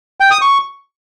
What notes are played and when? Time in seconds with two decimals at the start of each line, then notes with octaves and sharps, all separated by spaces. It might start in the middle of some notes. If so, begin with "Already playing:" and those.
0.20 G5
0.31 D#6
0.41 C#6